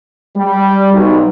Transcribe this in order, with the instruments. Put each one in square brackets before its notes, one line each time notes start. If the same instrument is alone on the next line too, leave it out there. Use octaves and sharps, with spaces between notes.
[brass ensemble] G3
B1